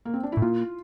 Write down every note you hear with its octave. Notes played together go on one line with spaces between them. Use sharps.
A#3
C4
D4
E4
A2
A#2 F4